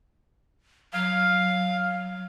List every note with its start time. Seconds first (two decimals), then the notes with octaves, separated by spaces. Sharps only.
0.94 F#3 F5